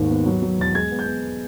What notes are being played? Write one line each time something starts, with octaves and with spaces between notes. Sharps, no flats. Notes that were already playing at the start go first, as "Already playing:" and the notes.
Already playing: D#2 G#2 D#3
B3
F#3
F#3
E1 A6
G#3 G#6
B3
G6
B3